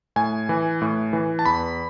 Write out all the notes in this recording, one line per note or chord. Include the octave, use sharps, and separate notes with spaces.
A2 G#5
E3
A2
E3
A5
E2 B5